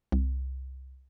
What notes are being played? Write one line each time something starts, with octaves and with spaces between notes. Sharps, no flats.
C2